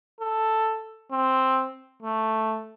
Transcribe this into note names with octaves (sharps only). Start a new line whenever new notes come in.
A4
C4
A3